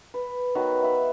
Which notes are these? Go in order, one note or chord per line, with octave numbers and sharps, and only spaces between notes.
B4
D#3 F#3 B3 B4
E5 F5 B5